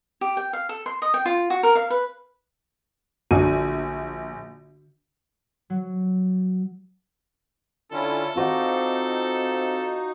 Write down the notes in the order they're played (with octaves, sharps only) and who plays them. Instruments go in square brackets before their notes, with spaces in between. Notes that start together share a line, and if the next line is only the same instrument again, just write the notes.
[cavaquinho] G4
G5
F5
A4
C6
D#5
G5
F4
F#4
A#4
F5
B4
[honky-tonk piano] A#1 G#5 D#7 [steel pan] D3 F#4
[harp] F#3
[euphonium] D3 [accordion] C#4 E4 F4 [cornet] A4
[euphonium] C4 [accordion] D#4 [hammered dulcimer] F4 F#4 D5